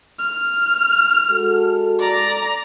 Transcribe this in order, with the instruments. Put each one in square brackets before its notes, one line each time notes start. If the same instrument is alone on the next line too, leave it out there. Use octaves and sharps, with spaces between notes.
[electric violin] F6
[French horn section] G#3 F#4 A4
[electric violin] D5 A#5